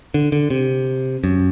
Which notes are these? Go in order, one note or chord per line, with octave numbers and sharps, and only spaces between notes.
D3
D3
C3
F#2